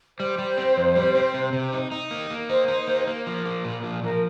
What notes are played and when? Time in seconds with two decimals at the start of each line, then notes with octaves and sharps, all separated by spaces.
0.19 G3 C5
0.38 G3
0.58 C4
0.77 F2
0.96 G3
1.15 C4
1.34 C3
1.53 C3
1.73 D#4
1.91 D#4
2.11 A#3
2.31 A#3
2.49 D#4 C5
2.68 D#4
2.88 A#3
3.07 A#3
3.26 F3 A#4
3.46 A#3
3.64 A#2
3.83 F3
4.03 F3 A#4